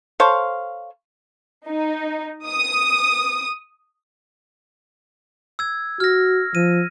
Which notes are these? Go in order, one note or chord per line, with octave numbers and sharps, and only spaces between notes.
A4 C5 C#5 F5
D#4
D#6
E6 G#6
F#4 F6 A#6
F3 D#7